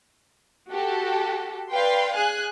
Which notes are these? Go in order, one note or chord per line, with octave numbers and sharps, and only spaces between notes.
F#4 G4 A4
B4 D5 F5 G5 C6
G#4 G#5 F#6